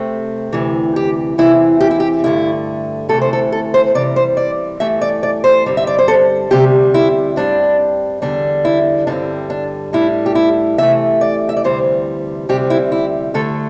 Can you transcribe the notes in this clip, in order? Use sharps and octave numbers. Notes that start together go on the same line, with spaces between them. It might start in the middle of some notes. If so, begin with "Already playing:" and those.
Already playing: C3 A3 C4
D2 C3 E3
G4
E2 C3 E3 C4 E4
G4
E4
G4
G2 D3 A3 E4
D2 C3 E3 A3 A4
C5
A4
A4
C5
C3 E3 G3 D5
C5
D5
G2 E3 A3 E5
D5
D5
C5
G2 D3 G3 C4
E5
D5
C5
A4
D2 C3 G3 G4
E4
G2 G3 C4 D4
E2 D3 G3 D4
E4
G2 D3 G3 C4 D4
D4
A2 G3 D4 E4
G4
E4
C3 E3 A3 E5
D5
E5
D5
D2 C3 E3 G3 C5
D2 C3 G3 C4 G4
E4
E4
D2 D3 A3 A4